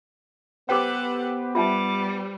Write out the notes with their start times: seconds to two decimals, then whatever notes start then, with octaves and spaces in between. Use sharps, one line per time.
0.69 B3 G4 A4 B4 C5 F#5 G5 D6
1.55 G3 F4 E5 A5